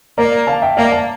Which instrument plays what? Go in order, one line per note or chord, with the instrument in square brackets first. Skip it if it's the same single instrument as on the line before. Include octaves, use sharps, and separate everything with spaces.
[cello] A#3 [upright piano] A#4 D5
[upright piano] F5 A5
E5 G5
[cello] A#3 [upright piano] D5 F5
[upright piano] F5 A5